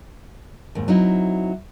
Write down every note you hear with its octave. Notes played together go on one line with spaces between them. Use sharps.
D#2 G#2
F#3 C4 D#4 E4